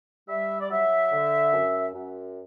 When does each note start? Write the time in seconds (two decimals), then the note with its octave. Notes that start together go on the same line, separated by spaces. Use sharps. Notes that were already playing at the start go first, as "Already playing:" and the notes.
0.28 G3 E5
0.61 D5
0.70 F#3 E5
1.12 D3
1.53 F#2
1.95 F#2